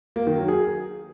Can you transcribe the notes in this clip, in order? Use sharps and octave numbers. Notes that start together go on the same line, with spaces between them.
A#3
D#3
F#3
G#4